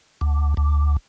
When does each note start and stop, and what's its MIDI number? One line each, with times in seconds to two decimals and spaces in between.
0.21 0.54 38
0.57 0.97 38